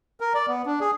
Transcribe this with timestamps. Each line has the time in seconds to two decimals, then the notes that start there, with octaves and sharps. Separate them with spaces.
0.20 A#4
0.34 D5
0.48 B3
0.66 D4
0.81 G#4